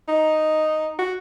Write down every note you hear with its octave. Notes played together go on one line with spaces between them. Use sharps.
D#4
F#4